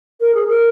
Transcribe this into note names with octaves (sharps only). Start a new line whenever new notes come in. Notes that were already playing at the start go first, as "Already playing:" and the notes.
A#4
G#4
A#4